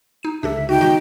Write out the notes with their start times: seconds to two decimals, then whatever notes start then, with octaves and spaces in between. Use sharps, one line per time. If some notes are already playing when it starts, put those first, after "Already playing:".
0.23 D#4 D#7
0.43 C#2 D3 D4 G4 A4 E5
0.69 D#4 F#4 G5
0.81 D#3 G#3 B3 F#4 A#6